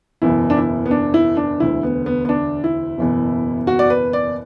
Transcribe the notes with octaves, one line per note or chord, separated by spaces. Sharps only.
F#1 E2 B2 E4
D4
E4
B3
D4
E4
D4
E1 D2 D3 E4
B3
B3
B3
D4
E4
F#1 E2 B2
F#4
D5
B4
D5